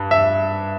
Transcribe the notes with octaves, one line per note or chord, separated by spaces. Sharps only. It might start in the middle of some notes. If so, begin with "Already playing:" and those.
Already playing: G2
E5